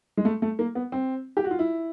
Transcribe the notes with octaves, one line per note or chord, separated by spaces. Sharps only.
G#3
A3
A3
A#3
B3
C4
G4
F#4
F4
E4